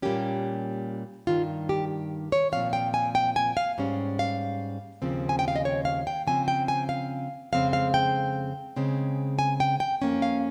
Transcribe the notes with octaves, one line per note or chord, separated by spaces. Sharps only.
A#2 G3 A#3 C#4 G4
G2 D#3 G3 F4
G4
C#5
A#2 F3 C4 F5
G5
G#5
G5
G#5
F5
G#2 G3 C#4
F5
D#2 C#3 F3 C4
G#5
G5
F5
D#5
C#5
F5
G5
C#3 F3 C4 G#5
G5
G#5
F5
F2 C#3 G#3 C4 F5
F5
G5
C#3 G#3 C4
G#5
G5
G5
F2 D#3 A#3 C#4
F5